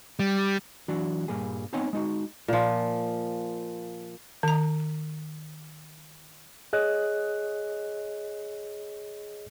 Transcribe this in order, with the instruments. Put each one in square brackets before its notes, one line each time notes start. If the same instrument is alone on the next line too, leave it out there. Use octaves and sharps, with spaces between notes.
[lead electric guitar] G3
[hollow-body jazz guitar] E3 F#3 D4 F#4
G2 A#2 G3 A#3 G#4
B3 C4 D#4 C#5 F#5 G#5
G#3 D#4 F#4
[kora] A#2 F3
[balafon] D#3 A#5
[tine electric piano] G#4 C#5 D#5 F#6